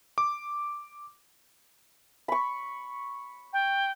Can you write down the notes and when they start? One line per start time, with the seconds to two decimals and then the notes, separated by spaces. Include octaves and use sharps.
0.18 D6
2.28 B5 C#6
3.53 G5